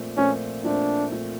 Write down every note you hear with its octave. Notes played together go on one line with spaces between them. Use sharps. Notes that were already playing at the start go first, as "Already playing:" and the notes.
Already playing: A#2 F3 A3 C4
A#2 F3 A3 C4 C#4
A#2 F3 A3 C4 D4
A#2 F3 A3 C4